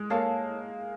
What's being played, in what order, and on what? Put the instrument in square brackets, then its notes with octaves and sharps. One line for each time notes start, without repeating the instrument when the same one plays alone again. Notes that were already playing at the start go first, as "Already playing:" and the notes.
Already playing: [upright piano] G#3
[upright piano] A#3 [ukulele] A4 C#5 F5 A5